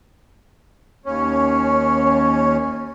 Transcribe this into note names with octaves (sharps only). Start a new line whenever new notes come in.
D#2 C#4